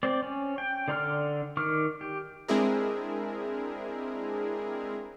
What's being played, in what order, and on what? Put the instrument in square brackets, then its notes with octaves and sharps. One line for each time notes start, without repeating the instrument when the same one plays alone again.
[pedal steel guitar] C4 D5
C#4
G5
D3 D5 A#5 C6 F6
D#3 C#6 D6 F6
G4
[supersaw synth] G#3 C4 D4 E4 G#4 A#4